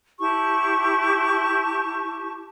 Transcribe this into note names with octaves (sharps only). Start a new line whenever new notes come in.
E4 G4 A5 C#6